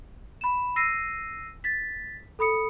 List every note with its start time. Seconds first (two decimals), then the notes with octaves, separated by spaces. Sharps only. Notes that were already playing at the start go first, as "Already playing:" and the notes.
0.41 B5 E7
0.76 E6 A#6 C7 D#7
1.64 A6 B6
2.39 A4 B5 D#6 C#7